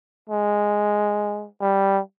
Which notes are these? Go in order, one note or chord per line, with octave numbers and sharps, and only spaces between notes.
G#3
G3